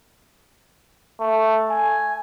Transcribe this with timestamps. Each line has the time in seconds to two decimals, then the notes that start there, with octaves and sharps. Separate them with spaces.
1.20 A3
1.71 G#5